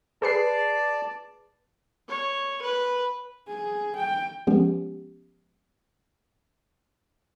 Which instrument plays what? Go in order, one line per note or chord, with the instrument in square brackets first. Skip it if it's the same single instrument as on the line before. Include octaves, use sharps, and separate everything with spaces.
[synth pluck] G#4 B4 C7 [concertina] D5 A5
[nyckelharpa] C#5
B4
[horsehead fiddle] G#4
G5
[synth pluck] F3 G#3 B3 C#4 G4